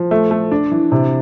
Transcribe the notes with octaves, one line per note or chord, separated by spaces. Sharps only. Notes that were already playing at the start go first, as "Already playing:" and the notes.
Already playing: F3
A3
A3
D4
E3
C3